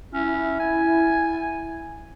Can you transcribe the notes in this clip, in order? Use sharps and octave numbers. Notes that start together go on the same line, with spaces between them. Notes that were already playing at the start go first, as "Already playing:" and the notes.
C#4 E4
G#5